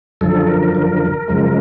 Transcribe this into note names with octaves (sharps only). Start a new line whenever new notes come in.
F#2 D3 F3 A4
A#4
A#4
F#2 C#3 F3 G#3